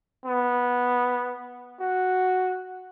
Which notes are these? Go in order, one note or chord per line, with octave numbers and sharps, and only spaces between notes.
B3
F#4